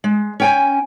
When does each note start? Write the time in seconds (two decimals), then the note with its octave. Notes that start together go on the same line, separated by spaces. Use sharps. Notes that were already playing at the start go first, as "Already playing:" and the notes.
0.04 G#3
0.40 C#4 G5 G#5